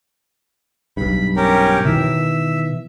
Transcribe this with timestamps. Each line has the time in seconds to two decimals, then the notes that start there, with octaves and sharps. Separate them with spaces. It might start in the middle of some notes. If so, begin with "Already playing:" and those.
0.97 B1 G2 B5
1.36 C#4 G4 A#4
1.85 B2 D#3 E3 E5